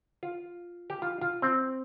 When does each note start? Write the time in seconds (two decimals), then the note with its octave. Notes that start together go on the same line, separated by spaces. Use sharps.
0.23 F4
0.90 G4
1.02 F4
1.21 F4
1.42 C4